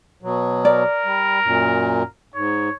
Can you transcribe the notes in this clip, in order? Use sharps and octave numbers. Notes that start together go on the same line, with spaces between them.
B2 F#3
A#4 D5
G3
F#2 A#2
G#2 C#5